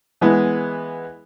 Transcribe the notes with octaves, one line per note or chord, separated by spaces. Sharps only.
E3 G#3 B3